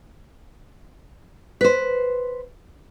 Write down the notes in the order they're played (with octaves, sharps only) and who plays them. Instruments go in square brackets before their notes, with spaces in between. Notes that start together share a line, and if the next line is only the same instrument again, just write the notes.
[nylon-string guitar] B4 C5